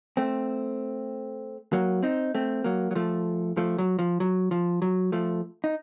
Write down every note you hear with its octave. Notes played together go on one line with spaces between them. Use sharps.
A3 C4
F#3 A#3
C4 D#4
A3 C4
F#3 A#3
F#3
F3 A3
F3 A3
F#3
F3
F#3
F3
F#3
F3 A3
D#4